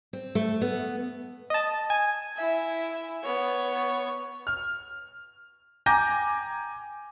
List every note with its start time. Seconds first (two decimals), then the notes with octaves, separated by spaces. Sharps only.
0.13 C4
0.35 A3
0.61 B3
1.50 D#5 A5
1.90 G#5
2.37 E4 E5
3.24 B3 C#5
4.47 F6
5.86 G5 G#5 A#5 D6 G6 A#6